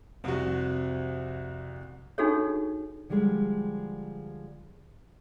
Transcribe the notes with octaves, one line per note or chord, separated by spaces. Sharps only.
C2 F2 C3 F#4
D4 D#4 F#4 G#4 A4 C#5
D3 F3 G3 G#3